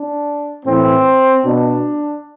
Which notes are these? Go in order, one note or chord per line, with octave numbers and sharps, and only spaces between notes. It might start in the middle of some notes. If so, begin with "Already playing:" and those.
Already playing: D4
A2 E3 C4
B2 D4